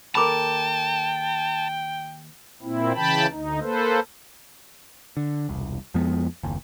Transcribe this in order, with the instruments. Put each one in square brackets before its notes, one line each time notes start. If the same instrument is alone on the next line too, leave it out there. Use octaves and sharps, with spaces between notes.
[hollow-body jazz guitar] D#2 A4 A#4 [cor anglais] G5 [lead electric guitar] A5 [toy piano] B5 D6
[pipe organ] A#2 C4 E4
C#3 E3 G5 A5 B5
D2 D#4
A#3 A4 B4 C5
[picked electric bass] D3
E1 C2
F2 F3 G#3 B3
F#1 D#2